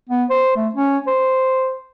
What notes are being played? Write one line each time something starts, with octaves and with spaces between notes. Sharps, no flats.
B3
C5
A3
C#4
C5